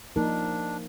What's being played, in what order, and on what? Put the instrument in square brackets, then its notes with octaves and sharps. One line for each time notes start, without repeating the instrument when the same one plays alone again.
[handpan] F3 A#3 D#4 A#4 [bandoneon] D4